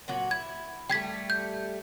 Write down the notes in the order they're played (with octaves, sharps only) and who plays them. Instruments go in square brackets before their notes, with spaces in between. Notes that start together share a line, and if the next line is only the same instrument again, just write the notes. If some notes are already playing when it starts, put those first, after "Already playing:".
[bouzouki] A#2 F#3 F#4
[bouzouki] E4 [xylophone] G#6
[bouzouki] G3 A3 [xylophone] G5 G#6 B6
[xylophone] G6